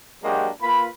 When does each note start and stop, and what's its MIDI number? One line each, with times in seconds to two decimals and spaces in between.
0.22 0.49 54
0.22 0.49 56
0.22 0.49 58
0.22 0.49 62
0.22 0.49 66
0.22 0.49 67
0.61 0.87 58
0.61 0.87 65
0.61 0.87 71
0.61 0.87 83